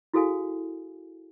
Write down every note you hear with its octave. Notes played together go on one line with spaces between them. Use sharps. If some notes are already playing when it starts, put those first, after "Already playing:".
E4 F#4 G#4 A4 F5 G#5